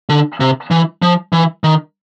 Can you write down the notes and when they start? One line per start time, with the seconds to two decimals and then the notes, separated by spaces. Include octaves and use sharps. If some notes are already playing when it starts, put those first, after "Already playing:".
0.09 D3
0.40 C3
0.71 E3
1.02 F3
1.33 E3
1.64 D#3